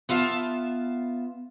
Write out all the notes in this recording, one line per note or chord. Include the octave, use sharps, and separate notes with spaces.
B3 F4 E5 F5 A5